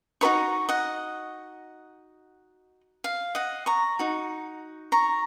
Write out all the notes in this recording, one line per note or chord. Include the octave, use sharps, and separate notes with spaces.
D#4 F#4 B4 D#5 A#5 C#6
D#5 F#5
F5
D#5 F#5
A#5 C#6
D#4 F#4
A#5 C#6